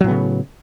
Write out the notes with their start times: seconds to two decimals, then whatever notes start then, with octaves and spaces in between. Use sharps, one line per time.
0.01 F#3
0.04 A2
0.07 B3
0.11 C#3